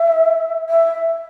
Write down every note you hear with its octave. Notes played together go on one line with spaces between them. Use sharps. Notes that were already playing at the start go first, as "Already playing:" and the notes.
Already playing: E5
E5